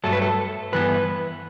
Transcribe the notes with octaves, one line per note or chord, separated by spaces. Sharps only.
G2 F#3 A3 A4
B4
A4
G2 E3 B3 B4